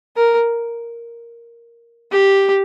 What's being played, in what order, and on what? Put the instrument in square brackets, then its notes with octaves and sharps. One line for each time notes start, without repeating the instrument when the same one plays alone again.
[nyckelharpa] A#4
G4